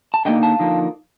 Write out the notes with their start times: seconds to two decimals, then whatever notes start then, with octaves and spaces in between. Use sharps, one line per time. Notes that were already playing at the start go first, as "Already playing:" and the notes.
0.14 A5
0.25 D3 F3 A#3 D#4 D#5 G5
0.42 F5 A5
0.60 D3 F3 A#3 D#4